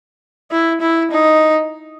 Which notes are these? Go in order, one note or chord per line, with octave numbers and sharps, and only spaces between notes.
E4
E4
D#4